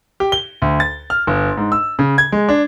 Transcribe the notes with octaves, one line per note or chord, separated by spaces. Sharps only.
G4
G7
D2
A6
F6
G1
G#2
E6
C#3
G#6
G#3
D4